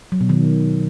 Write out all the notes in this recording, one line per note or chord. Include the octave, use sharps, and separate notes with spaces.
F#3
B2
D#3